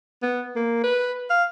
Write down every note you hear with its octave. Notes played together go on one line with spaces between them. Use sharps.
B3
A#3
B4
F5